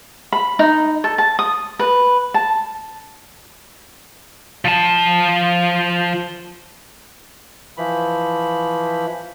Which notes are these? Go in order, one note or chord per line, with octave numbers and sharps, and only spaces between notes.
B5
D#4
A4
A5
D#6
B4
A5
F3 A5
E3 F3 B5